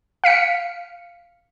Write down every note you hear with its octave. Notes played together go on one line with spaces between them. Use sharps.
F5 B6 C#7